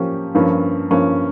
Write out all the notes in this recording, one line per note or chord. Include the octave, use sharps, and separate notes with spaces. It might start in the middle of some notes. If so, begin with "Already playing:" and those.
Already playing: F3 A#3 C#4 G4
G2 F3 A#3 C#4
G2 F3 A#3 C#4